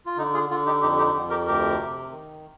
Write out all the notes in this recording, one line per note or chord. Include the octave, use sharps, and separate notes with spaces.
F4
D3 D#4
F4 G#4
D3 F4
D#4 G4
F2 D#4 G4
D#4 G4
F2
G4 A#4
D2 G4 A#4
C3
D#3